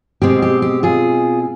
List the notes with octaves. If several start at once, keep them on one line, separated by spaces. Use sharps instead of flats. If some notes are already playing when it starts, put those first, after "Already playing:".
B2 G#3 C4 G4
G4
G4
F4 G#4